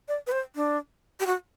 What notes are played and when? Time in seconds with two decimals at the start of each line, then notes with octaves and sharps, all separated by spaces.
0.08 D5
0.27 B4
0.32 C5
0.55 D4
1.20 G4
1.26 F#4